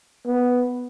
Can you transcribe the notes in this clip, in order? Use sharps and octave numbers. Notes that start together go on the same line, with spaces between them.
B3